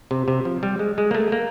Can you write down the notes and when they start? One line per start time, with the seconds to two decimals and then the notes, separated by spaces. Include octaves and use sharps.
0.11 C3
0.28 C3
0.45 F3
0.63 G3
0.79 G#3
0.98 G#3
1.11 A#3
1.15 A3
1.32 A#3